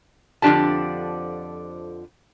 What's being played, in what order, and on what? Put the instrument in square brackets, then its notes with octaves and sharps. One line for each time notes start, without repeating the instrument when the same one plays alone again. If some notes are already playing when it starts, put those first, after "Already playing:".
[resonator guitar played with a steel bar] F2 D3 F3 D4 G4 A5